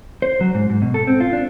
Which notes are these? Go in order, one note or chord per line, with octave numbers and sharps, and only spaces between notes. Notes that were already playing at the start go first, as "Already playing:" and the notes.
C5
F#3
G#2
G#2
B2
A4
C4
F4
D4